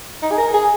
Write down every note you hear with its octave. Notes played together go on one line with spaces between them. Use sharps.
D#4
G#4
A#4
G#4